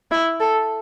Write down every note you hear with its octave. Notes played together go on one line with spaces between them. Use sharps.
E4
A4